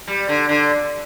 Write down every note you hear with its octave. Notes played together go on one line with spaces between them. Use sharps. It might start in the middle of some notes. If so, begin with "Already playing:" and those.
G3
D3
D3